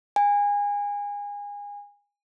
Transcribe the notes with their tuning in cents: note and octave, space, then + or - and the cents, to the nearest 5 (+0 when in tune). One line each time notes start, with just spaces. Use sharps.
G#5 -25